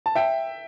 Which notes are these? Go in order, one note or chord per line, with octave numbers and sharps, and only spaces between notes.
A5
E5 G5